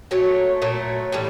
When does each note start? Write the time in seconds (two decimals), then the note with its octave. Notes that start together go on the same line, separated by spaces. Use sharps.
0.11 A#2 F#3 A3 C#5
0.62 A#2 F#3 A3
1.12 A2 E3 G3